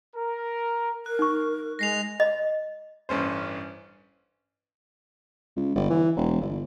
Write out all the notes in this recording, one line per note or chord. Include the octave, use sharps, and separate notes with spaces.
A#4
A#4 F#6
D#4 C#6
G#3 A#6 C7 F7
D#5
A1 G2 C#4 C5
C#2
G1
E3
E1
G1